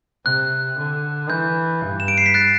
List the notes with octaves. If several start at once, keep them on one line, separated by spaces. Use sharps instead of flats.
C3 F#6
D3
E3 G6
G2
E7
D7
C7
B6
F#6 A6